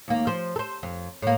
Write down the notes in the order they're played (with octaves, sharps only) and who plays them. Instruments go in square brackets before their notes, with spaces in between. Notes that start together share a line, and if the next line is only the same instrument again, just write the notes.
[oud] D#2 A#3
F3 C5
A4 C5
F2
A2 A#3